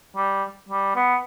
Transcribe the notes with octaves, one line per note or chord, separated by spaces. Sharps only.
G3
G3
B3